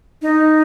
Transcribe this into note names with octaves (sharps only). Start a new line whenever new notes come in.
D#4